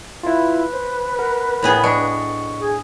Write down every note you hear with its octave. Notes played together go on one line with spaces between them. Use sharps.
E4 F4 B4
C5
A#4 F#5
A2 B3 G#4
D4 D#5 C#6
G#4